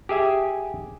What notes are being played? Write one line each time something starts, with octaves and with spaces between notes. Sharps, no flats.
G4 G#4 E5 G#5